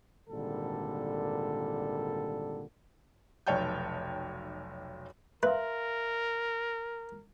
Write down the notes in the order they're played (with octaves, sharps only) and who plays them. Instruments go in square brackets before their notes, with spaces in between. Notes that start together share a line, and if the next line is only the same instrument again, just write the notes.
[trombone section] G#1 A#2 D3 G3 A4
[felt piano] F1 B1 C#5 G5 A5 G6
[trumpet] A#4 [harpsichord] B4 [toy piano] E5 F5 C6